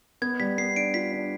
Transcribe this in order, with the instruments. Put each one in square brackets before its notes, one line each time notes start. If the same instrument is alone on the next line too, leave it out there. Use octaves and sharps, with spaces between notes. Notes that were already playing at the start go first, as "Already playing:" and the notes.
[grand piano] B3 [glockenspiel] G#6
[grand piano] G3 [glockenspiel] B6
[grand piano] B3 [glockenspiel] C7
[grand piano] D4 [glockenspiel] D7
[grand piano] F4 [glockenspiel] B6
[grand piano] D4